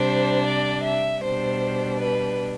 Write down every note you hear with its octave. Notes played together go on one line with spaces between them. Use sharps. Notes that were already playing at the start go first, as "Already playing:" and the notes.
Already playing: C3 G3 D4 C5
D5
E5
B2 G3 D4 C5
B4